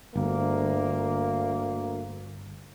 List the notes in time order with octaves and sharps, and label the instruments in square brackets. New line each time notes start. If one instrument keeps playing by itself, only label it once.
[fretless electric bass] G1 [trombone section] D2 A#3